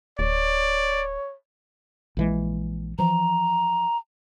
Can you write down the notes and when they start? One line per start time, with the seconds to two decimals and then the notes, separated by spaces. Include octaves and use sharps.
0.19 D1 C#5 D5
2.17 A#1 E3 G#3
2.99 E3 F3 A#5